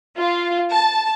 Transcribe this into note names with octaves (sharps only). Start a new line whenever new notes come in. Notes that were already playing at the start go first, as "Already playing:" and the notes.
F4
A5